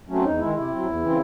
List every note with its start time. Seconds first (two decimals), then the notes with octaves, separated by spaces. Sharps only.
0.08 F#3 A3 C4 C#4
0.23 E2 D#4
0.39 D#3 G#3 E4
0.54 C3 E4
0.69 F#3 C4
0.85 E2
1.01 C#3 E3 C4